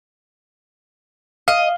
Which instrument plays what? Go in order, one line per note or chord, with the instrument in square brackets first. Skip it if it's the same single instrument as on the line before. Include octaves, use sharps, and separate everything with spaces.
[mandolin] D#5 [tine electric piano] F5